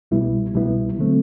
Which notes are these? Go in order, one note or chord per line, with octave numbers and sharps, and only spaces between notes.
C2 B2 G3 B3 E4
C2 B2 G3 B3 E4
D3 F#3 A3 C4